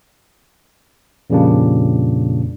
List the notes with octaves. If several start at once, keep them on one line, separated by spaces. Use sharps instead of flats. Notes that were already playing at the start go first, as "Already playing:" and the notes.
F2 A#2 C#3 G3 A#3 D4